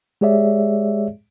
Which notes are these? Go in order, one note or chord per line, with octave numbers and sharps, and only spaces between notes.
G#3 G4 G#4 C#5 D5 E5